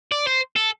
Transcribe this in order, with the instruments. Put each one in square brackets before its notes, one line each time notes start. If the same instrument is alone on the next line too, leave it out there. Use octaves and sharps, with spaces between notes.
[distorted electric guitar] D5
C5
A4